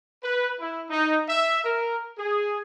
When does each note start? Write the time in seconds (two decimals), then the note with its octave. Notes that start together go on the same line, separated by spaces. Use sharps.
0.23 B4
0.61 E4
0.90 D#4
1.29 E5
1.64 A#4
2.18 G#4